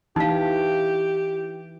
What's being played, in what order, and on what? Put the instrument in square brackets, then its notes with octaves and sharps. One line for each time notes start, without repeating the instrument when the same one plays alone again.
[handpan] E3 [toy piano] D#4 F5 [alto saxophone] G4